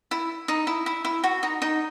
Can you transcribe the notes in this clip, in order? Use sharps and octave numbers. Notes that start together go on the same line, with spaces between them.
E4
D#4
E4
E4
E4
F#4
D#4
D#4